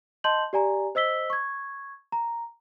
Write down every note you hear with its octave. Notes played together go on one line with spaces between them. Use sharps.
D#5 A5 C6 G6 F#7
G4 D5 G#5 A#5
C5 D#5 E6 B6 G7
C#6 G#6
A#5